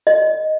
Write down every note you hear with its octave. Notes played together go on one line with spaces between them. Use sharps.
D#5